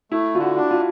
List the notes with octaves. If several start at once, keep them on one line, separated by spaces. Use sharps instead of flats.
A3 E4
D3 F4
F#4
D4
F4